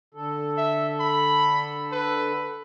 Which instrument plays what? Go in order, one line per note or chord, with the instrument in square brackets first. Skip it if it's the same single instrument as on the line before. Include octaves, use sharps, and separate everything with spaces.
[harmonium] D3 A4
[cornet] E5
B5
B4